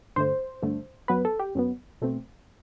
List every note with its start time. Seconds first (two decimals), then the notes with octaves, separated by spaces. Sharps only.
0.16 G2 D3 A3 C5
0.62 G2 D3 A3
1.08 F#2 F#3 B3 B4
1.25 A4
1.39 G4
1.55 F#2 F#3 B3
2.02 B2 A3 C4